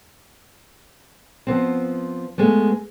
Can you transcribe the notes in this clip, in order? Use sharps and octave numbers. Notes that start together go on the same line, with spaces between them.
F3 B3 C4
G#3 A3 B3